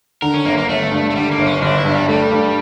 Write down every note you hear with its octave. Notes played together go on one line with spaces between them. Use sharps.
D3 A#4
C#4
G1 A#3
A#3
G1 A3
G2
A3
D3 G3
A#3
G1
C#4
G1 D4
E4
G2
G3
G3 A3
G2